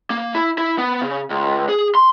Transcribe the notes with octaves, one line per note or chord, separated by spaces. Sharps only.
A#3
E4
E4
B3
C#3
C#2
G#4
C6